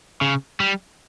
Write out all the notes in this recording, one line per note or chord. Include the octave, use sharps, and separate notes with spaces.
C#3
G3